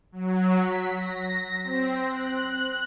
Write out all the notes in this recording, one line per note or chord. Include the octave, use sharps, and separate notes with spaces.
F#3
B6
A#6
C4
F#6